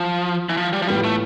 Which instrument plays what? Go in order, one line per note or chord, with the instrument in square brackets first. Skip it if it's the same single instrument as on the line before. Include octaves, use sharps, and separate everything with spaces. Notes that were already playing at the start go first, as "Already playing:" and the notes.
Already playing: [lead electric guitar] F3
E3
F3
G3
F3
[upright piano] A2 E3 B3 F4 [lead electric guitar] G3
[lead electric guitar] A3